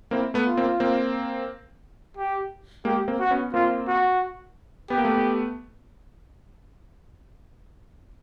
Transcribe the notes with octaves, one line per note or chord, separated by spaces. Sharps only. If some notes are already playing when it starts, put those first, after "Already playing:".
A#3 C4 E4
A3 B3
F4
A#3 C4
A#3 C4
G4
G#3 A#3 G4
A#3 C4
F#4
B3 C#4
A#3 C4 F4
F#4
B3 G4
A#3
A3 B3